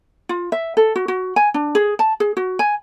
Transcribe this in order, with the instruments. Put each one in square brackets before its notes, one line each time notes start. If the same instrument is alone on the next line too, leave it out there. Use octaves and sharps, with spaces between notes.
[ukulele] F4
E5
A4
F#4
F#4
G#5
D4
G#4
A5
G#4
F#4
G#5